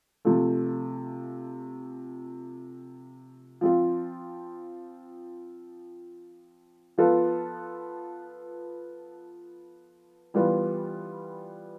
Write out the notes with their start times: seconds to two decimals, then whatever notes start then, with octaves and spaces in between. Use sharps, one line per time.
0.25 C3 F3 A3
3.61 F3 C4 F4
6.98 F3 B3 F4 A4
10.34 E3 G3 B3 F4